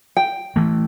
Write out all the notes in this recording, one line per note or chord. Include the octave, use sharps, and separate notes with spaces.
G5
E3 A3